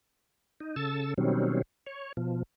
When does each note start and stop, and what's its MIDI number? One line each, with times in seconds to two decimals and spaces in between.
0.60 0.76 63
0.76 1.14 49
0.76 1.14 69
0.76 1.14 88
0.76 1.14 93
1.18 1.62 47
1.18 1.62 51
1.18 1.62 54
1.18 1.62 55
1.18 1.62 60
1.18 1.62 61
1.86 2.12 73
2.17 2.43 47
2.17 2.43 53